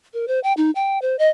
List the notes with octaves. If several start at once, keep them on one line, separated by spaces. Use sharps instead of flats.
A#4
C5
G5
D#4
G5
C5
D#5